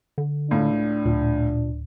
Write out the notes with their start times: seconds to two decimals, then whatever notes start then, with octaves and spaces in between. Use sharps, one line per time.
0.18 D3
0.51 C#2 A2 D4
1.05 D1 A#2